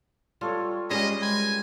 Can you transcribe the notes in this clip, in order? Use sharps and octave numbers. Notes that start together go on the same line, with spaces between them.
G3 F4 A4 C#5
G3 G#3 C#4 G4 B4 D#5
B4 G#5